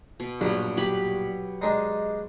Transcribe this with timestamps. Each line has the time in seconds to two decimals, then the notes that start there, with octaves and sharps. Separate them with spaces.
0.20 B2
0.41 A#1 G2 F#3
0.77 F#3 G4 B5
1.61 G#3 D4 D#4